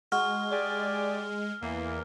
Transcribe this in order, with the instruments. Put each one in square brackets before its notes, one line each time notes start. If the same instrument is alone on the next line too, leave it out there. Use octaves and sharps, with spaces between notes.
[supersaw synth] G#3 [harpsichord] F#4 [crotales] F6
[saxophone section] G4 G#4 D5
[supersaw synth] E2 [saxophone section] E3 A#3